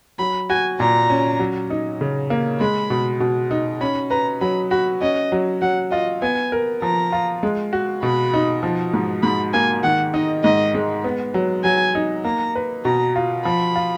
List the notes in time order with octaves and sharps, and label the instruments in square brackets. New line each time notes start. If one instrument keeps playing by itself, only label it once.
[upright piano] F#3 [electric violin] B5
[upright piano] F#4 [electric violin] G#5
[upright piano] A#2 [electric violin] A#5
[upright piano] C#4
F#3
D#4
C#3
A#3
[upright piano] G#3 [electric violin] B5
[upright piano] B2
B2
D#4
[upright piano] C#4 [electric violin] B5
[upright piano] B4 [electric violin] A#5
[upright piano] F#3 [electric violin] B5
[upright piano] F#4 [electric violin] B5
[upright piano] C#4 [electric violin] D#5
[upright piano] F#3
[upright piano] F#3 [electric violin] F#5
[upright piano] F4 [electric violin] D#5
[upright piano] B3 [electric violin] G#5
[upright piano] A#4
[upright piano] F3 [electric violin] A#5
[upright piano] F4
G#3
F#4
[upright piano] B2 [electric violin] B5
[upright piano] D#4
F3
G#2
[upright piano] G#2 [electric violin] B5
[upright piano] A#3 [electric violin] G#5
[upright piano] D#3 [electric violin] F#5
[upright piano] D#4 [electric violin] D#5
[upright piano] G#2 [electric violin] D#5
[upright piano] G#3
B3
F#3
[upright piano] F#3 [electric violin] G#5
[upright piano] D#4
[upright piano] A#3 [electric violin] A#5
[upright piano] B4
[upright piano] B2 [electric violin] A#5
[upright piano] F4
[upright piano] F3 [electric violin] B5
[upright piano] F4